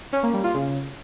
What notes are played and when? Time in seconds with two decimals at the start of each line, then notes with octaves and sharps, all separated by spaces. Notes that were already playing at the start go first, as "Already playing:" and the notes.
0.13 C#4
0.23 A#3
0.33 G3
0.44 F4
0.54 C#3